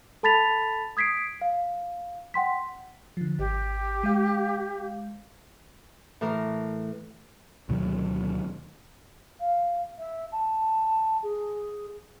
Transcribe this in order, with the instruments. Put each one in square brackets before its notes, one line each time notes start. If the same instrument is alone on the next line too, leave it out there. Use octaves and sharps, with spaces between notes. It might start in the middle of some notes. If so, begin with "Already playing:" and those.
[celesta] A4 A5 B5 A6 B6 F7
D#6 G#6 B6 C7 D7
F5
F#5 G5 C6 B6
[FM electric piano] D3 F3
[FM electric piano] G#1 [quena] G4
[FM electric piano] G#3 F5
[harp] A2 E3 A#4
[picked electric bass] D2 B2 D#3 F#3
[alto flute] F5
E5
A5
G#4